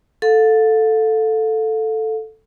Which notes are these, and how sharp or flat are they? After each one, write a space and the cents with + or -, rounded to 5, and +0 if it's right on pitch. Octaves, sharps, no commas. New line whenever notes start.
A4 +0 F5 +35